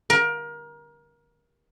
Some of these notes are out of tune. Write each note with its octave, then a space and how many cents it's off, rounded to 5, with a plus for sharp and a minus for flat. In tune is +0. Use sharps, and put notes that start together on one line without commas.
A#4 +25